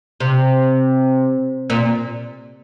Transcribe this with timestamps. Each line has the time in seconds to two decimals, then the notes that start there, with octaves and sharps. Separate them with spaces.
0.20 C3
1.70 A#2